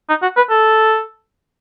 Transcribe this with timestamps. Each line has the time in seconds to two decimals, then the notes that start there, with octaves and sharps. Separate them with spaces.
0.09 D#4
0.22 F#4
0.37 B4
0.50 A4